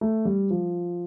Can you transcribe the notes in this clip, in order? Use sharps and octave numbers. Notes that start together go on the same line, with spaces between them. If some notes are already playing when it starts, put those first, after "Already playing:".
A3
G3
F3